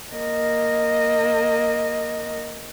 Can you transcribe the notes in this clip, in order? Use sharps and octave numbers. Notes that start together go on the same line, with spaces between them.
A#3 D#5